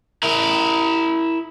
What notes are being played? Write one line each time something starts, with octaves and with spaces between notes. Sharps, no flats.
E4 A#4